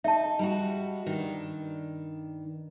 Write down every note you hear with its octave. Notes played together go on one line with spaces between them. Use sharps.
D#4 E5 A5
G3 G#3 F#4
G2 D#3 D4